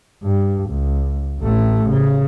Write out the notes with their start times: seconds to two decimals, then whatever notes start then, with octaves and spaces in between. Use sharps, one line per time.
0.23 G2
0.70 C#2
1.40 A1 A3
1.90 C#3